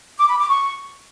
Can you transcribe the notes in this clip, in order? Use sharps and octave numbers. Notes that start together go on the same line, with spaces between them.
D6
B5
D6
C#6